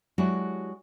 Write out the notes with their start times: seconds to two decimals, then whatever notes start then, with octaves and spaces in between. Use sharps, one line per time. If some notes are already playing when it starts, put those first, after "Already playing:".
0.18 F#3 G#3 D4 E4 F#4 G4